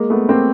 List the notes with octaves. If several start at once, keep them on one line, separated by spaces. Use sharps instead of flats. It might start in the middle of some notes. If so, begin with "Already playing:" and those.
Already playing: G#3 A#3
A3 B3
A#3 C4